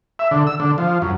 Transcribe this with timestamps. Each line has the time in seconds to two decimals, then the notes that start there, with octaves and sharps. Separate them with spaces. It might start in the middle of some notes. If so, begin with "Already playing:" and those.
0.19 E5
0.31 D3
0.47 E6
0.60 D3
0.78 F3
1.02 F#2